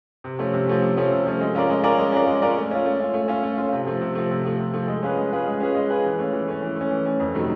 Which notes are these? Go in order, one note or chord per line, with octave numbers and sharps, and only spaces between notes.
C3
F3 A3 C#4
C3
F3 A3 C#4
C3
F3 A3 C#4
C3
F3 A3 C#4
G#3
C#4 F4 A#4 D5
G#3
C#4 F4 A#4 D5
G#3
C#4 F4 A#4 D5
G#3
C#4 F4 A#4 D5
A3
C#4 F4
A3
C#4 F4
A3
C#4 F4
A3
C#4 F4
C3
F3 A3
C3
F3 A3
C3
F3 A3
C3
F3 A3
G#3
C#4 F4 G#4 B4
G#3
C#4 F4 G#4 B4
G#3
C#4 F4 G#4 B4
G#3
C#4 F4 G#4 B4
E3
A3 C#4
E3
A3 C#4
E3
A3 C#4
E3
A3 C#4
F2
C3 D#3 F#3 A3